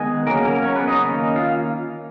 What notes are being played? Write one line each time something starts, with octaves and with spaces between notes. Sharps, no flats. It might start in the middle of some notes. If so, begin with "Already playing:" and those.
Already playing: D#3 G#3 B3 G#4
C#3 F#3 A#3 C#4 A#4
A#3 A#4
C#4 C#5
B3 B4
D#4 D#5
D#3 A#3 C#4
F4 F5